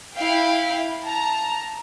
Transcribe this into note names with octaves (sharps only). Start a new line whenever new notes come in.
E4 F5 G5
A5 A#5